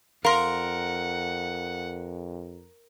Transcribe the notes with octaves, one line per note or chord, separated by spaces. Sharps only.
F2 A#4 F5 F#5 C6